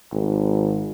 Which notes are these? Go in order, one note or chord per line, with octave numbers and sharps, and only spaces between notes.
G#1